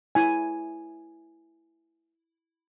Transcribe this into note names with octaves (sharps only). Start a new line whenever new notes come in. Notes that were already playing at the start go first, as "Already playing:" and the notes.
E4 G#5